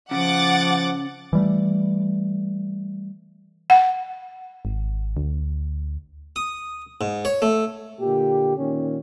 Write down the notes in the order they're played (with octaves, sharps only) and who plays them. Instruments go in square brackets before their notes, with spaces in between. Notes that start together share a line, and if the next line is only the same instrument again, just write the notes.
[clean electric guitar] C#3 [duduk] F3 [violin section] F#5 D6 A6
[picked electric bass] E3 G3 A3
[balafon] F#5
[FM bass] G#1
D2
[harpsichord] D#6
G#2
C#5
A3
[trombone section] A#2 D3 G4
A#2 D#3 C#4